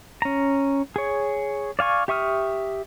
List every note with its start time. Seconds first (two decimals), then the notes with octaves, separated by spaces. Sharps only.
0.22 C#4 A#5
0.96 G#4 C#5
1.79 D5 F5 G#5 C#6
2.08 G4 E5 C#6 D#6 F6